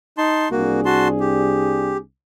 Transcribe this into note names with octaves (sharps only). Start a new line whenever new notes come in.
D#4 A5 C6
C2 A#3 D4 F#4 G#4
F#4 A5 C6
G4